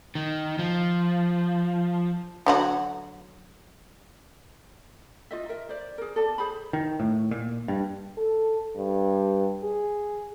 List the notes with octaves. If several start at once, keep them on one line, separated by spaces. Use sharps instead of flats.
D#3
F3
D3 F#3 F#4
F4 D#5 E5
A#4 E5
C5 D5
G#4 A#4
A4 D5 A5
G#4 C5 B5
D#3
A2
A#2
G2
A4
G2
G#4